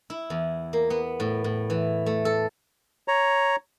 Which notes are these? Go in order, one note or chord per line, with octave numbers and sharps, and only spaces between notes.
E4
E2
A#3
B3
A2
A2
E3
A3
A4
C#5 A#5